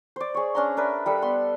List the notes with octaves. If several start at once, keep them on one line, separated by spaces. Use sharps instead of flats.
C5 D5
G#4 C#5
C#4 D4 A#5 C6
D4 A#4 B4 E5
G3 A4 B5
B3 C6